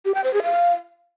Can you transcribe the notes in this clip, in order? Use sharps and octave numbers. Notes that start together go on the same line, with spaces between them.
G4
G5
C5
G#4
F5